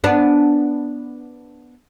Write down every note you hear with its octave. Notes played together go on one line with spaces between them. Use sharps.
B3 D4